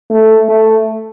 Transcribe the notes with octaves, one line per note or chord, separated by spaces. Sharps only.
A3
A3